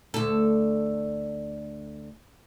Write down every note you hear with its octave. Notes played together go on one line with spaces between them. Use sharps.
D2 A4